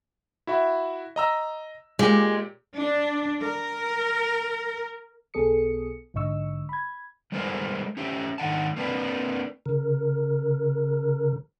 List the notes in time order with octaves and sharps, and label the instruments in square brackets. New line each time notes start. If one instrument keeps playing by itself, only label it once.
[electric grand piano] E4 F#4 E5
D#5 A#5 E6
[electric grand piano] A#2 G4 [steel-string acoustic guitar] G#3
[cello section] D4
A#4
[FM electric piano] B1 B3 G#4 A4 D#6 C#7
A#1 G#2 D3 D#5 C#6 E6
B5 G#6
[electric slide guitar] G3 G#3 B3 G#4 A#4 C5
C#4 G4 E5
G#2 D#3 F#5 A5
A#3 C4 D4 A#4 B4
[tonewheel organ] C#3 A#4